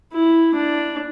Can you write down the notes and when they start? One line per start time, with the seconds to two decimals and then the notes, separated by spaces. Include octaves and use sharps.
0.13 E4
0.55 D4